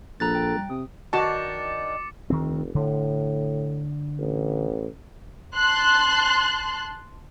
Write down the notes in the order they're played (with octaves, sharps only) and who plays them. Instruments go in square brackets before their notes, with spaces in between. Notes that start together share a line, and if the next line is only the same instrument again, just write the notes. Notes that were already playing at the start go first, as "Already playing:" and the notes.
[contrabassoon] A#1 [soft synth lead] A4 [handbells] A#5 F#6 A6
[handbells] G5
[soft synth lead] G3
[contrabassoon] C3 [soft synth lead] D#6
[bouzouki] D#3 D4 [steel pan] F#4 A5 [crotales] D6 A6 C#7
[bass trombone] F1 [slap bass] D2 D#3 C4
[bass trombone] A2 [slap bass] D3
[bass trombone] A1
[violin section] A5 C6 F#6